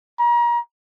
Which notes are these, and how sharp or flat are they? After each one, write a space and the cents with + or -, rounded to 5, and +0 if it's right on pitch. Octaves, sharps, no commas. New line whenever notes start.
A#5 +35